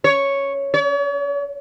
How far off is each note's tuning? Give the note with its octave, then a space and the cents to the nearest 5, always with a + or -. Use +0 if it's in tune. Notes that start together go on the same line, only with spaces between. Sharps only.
C#5 +0
C#5 +45